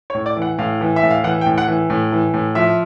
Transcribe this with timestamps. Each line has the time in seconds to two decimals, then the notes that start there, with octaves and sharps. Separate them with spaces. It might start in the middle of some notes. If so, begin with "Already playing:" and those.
0.10 C#5
0.15 A2
0.26 D5
0.37 E3
0.42 F#5
0.58 A2 F5
0.81 E3
0.96 E5
1.03 A2
1.11 F5
1.24 E3 F#5
1.41 G5
1.46 A2
1.58 F#5
1.68 E3
1.90 A2
2.12 E3
2.34 A2
2.55 F3 E5